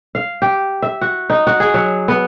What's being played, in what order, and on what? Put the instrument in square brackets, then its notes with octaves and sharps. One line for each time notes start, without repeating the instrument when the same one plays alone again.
[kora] F5
G4
E5
F#4
D#4
F#4
G#4
F#3
B3